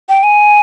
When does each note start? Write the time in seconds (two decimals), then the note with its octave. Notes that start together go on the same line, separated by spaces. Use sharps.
0.09 G5
0.23 G#5